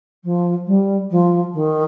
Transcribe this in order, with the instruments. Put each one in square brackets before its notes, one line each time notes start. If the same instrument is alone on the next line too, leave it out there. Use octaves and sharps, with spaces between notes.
[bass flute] F3
G3
F3
D#3